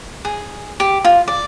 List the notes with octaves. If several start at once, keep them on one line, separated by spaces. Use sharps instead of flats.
G#4
G4
F4
D5